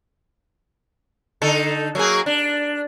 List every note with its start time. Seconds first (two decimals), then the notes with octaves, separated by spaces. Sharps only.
1.42 D3 D#4 A4
1.95 F#3 A#3 G#4
2.26 D4